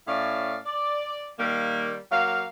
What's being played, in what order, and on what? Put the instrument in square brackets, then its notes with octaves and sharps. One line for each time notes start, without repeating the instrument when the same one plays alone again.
[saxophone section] A2 C#4 E4 D5 F5
D5
D#3 G3 A#3
F#3 A#3 F5